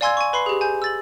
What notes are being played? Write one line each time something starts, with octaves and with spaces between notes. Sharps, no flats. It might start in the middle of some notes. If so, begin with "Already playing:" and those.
D5 F5 G#5 C6 E6 G#6
G#5 C#6
B4 B5 C6 C7
G4 G#4
G#5 G6
E6 A6 F#7